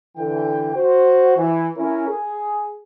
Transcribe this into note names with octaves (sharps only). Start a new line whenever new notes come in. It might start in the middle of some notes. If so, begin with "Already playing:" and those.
D3 E3 G5
F#4 C5
E3
C#4 E4 A#4
G#4